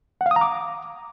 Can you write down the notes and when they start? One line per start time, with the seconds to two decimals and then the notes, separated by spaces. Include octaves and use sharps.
0.21 F#5
0.26 F5
0.31 D#6
0.36 A#5
0.41 D6